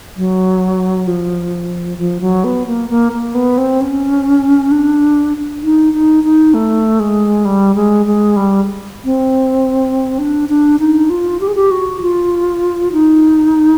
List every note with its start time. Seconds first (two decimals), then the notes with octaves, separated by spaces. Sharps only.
0.17 F#3
1.07 F3
1.98 F3
2.21 F#3
2.44 B3
2.67 A#3
2.90 A#3
3.12 A#3
3.35 B3
3.58 C4
3.81 C#4
4.71 D4
5.63 D#4
5.93 D#4
6.24 D#4
6.54 A3
7.00 G#3
7.45 G3
7.75 G#3
8.06 G#3
8.36 G3
9.05 C4
10.19 D4
10.49 D4
10.80 D#4
11.10 F4
11.40 G4
11.48 G#4
11.55 G4
11.71 F#4
12.01 F4
12.92 D#4